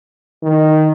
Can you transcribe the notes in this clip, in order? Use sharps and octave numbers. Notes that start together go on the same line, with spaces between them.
D#3